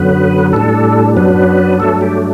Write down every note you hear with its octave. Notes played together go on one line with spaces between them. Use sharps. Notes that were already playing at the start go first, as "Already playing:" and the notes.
Already playing: F#2 D3 F#3 B3 B4
A2 G3 D4 A4
F#2 F#3 B3 D4 B4
G2 F#3 A3 D4 A4
G4